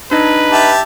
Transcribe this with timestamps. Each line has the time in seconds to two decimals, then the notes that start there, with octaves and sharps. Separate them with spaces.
0.11 D4 D#4 B4 D#5
0.52 G4 E5 A5